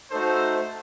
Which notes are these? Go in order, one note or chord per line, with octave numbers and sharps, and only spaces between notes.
A3 D#4 F#4 A4 C5